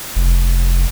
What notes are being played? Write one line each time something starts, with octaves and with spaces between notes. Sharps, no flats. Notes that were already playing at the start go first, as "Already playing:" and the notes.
F1